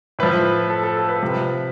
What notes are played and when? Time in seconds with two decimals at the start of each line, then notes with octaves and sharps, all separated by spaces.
0.19 A2 F3 B4
0.70 A4
0.83 A4
0.97 A4
1.09 B4
1.22 C3 F3